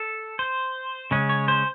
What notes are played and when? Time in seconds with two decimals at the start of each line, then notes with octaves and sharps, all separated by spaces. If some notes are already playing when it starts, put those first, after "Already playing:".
Already playing: A4
0.39 C5
1.11 C#3 G#3 C#4
1.29 C#5
1.48 C5